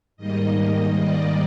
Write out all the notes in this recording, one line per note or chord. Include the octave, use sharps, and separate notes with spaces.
G#2 D#3 G3 A#3 D#5
D5